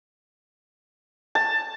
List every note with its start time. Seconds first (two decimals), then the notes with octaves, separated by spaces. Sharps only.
1.35 A5